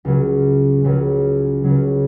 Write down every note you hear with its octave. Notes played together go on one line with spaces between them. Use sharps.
C#2 C#3 F#3
C#2 C#3 F#3
C#2 C#3 F#3